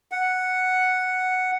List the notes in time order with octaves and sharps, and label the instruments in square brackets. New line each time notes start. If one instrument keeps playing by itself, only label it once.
[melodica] F#5